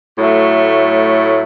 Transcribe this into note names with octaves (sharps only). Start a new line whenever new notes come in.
A2 F#3 A3